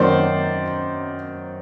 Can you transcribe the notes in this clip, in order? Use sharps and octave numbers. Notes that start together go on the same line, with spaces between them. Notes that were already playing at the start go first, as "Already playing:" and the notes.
Already playing: F#2 D#3 F#3 A#3 C5 D5